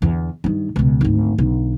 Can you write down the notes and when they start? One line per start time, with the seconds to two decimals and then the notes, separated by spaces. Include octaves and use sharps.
0.02 E2 D3
0.44 G2 D#3
0.76 C#2 B2
1.01 G#1 D2
1.38 B1 D3